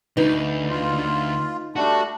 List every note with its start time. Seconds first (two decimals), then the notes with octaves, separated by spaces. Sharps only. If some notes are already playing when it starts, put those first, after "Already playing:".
0.17 D2 D3 D#4 B4
0.69 F4
1.76 G3 A3 D4 F#4